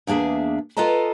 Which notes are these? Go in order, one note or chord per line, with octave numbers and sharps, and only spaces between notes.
E2 A#3 D4 G#4 E5
F4 A4 B4 D#5 A5 A#5